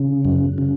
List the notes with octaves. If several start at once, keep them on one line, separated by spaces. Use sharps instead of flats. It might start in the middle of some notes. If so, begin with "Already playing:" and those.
Already playing: C#3
F#2
C#3